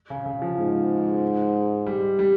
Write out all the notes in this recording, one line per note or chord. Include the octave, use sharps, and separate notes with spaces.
C#3
C#3
F3
G#2
G3
G3